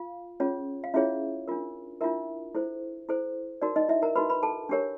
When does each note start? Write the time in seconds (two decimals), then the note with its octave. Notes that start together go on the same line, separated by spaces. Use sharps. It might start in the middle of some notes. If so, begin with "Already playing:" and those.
Already playing: F4 F5
0.40 C#4 F4 G#4 C#5
0.84 F5
0.94 C#4 E4 F4 G#4 C#5 E5
1.48 D4 F4 A#4
2.01 D4 E4 F4 A#4 E5
2.55 E4 A4 C5
3.09 E4 A4 C5
3.62 D#4 F#4 A#4 D5
3.76 D#4 D#5
3.89 E4 E5
4.02 A#4 A#5
4.16 D#4 F#4 A#4 B4 B5
4.30 B4 B5
4.43 A4 A5
4.69 D4 G4 A#4 C#5